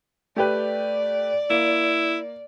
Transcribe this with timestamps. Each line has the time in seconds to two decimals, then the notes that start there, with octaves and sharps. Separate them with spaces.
0.36 A3 G4 B4 D5
1.50 A#3 E4